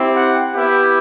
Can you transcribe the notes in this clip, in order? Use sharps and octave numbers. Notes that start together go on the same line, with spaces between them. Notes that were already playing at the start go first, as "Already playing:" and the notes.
Already playing: C4 E4 G4
F#5
B3 E4 G4